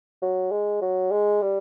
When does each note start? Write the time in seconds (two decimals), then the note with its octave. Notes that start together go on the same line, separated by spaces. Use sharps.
0.22 F#3
0.52 G#3
0.82 F#3
1.12 G#3
1.42 G3